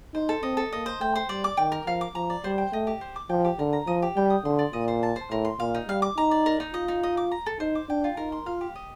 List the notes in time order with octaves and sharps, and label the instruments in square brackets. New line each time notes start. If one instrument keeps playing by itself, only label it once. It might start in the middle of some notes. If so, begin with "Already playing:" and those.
[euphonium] D#4 [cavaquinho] C5
[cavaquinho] A4
[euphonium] C4 [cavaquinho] D#5
[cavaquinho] A4
[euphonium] A#3 [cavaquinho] D#5
[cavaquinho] C5
[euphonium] A3 [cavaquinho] G5
[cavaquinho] C5
[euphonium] G3 [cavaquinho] D5
[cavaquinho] D6
[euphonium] D#3 [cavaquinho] G5
[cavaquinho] A#4
[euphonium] F3 [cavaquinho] F5
[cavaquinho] D6
[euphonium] F3 [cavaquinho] A#5
[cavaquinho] D5
[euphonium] G3 [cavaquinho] C5
[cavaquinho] G5
[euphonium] A3 [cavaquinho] D#5
[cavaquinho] G4
C5
D6
[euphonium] F3 [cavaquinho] G5
[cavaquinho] G4
[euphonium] D3 [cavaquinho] A#4
[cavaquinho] A#5
[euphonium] F3 [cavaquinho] D#5
[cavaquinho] G4
[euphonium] G3 [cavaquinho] G5
[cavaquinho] D#6
[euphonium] D3 [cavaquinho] C6
[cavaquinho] D5
[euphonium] A#2 [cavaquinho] D#5
[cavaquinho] C5
A5
C5
[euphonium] A2 [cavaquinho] A#4
[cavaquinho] C6
[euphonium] A#2 [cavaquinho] F5
[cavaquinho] D#4
[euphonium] G3 [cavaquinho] F5
[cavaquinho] D6
[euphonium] D#4 [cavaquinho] A#5
[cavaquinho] D5
A#4
D#4
[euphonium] F4 [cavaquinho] D#5
[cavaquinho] D#4
D#5
D6
A#5
A4
[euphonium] D#4 [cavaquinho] C5
[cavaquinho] D6
[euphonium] D4 [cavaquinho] G5
[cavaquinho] F4
[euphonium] D#4 [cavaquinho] A#4
[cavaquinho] C6
[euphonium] F4 [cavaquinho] F5
[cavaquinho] G4
D#5